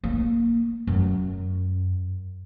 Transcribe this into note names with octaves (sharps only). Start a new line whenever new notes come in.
A#3
F#2